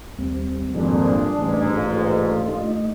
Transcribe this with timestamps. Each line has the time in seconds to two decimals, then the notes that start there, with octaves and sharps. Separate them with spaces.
0.18 D#2 G3 C4
0.75 G#1 F2 A#2 D3 G3 D4 G#4
1.39 A1 G#2
1.76 A#1 G2 F4 A4
2.48 A3 D#4 D#5